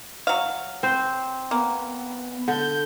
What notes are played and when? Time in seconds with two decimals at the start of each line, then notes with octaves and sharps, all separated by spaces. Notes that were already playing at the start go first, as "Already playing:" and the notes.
0.27 F#3 F5
0.83 C4 C5
1.51 A#3 B3
2.48 D3 G6